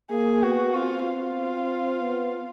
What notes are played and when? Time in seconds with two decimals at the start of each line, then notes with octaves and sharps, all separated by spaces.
0.11 A#3 G#4
0.42 B3 F#4
0.75 C4 F4
1.06 F4
2.01 B3